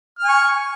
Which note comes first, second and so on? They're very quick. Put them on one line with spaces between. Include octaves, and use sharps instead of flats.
F6 G#5 C#6